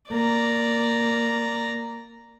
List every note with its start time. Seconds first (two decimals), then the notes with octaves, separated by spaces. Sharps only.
0.11 A#3 D5 A#5